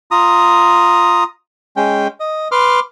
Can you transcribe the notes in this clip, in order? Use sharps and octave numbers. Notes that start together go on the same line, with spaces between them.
F4 A#5 D#6
G#3 C#4 G5
D#5
B4 C6 D6 F6